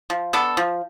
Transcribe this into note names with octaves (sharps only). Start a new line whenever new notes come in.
F3
B3 D4 A4
F3